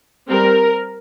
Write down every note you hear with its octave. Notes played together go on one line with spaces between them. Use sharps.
G3 C4 A#4